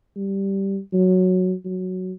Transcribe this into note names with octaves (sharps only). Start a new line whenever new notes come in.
G3
F#3
F#3